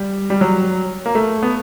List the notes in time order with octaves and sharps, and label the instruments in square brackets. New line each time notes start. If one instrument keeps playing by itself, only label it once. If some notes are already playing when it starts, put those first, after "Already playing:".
Already playing: [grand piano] G3
G3
F#3
A#3
A3
B3